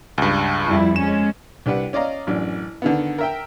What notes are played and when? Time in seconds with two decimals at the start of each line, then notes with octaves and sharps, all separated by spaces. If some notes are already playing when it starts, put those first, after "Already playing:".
0.18 C#2 G2
0.67 F2 G3 E4
0.96 G#3 C#4 E7
1.66 C2 D4 G4 B4 F#5
1.93 C#4 D5 D#5 F5 A#5
2.27 A1 F#2 D4
2.82 D3 D#3 B3
3.18 A#4 E5 G5